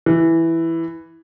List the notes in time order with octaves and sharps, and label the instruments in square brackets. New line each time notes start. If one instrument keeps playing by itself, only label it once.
[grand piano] E3